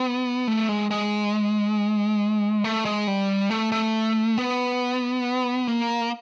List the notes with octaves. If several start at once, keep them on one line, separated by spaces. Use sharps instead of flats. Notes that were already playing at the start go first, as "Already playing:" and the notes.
Already playing: B3
A3
G#3
G#3
A3
G#3
G3
A3
A3
B3
A#3